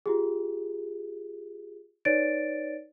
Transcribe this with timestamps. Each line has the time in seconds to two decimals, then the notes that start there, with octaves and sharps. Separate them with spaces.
0.06 F4 G4 G#4
2.05 D#4 B4 C#5 D5 A6 D7